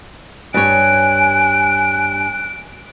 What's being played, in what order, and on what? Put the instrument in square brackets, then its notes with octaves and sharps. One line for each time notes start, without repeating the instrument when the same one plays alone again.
[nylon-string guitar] G2 C#5 [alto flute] G#5 [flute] F#6 [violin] D7